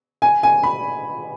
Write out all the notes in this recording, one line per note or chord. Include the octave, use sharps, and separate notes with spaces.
G#5
G#5
B5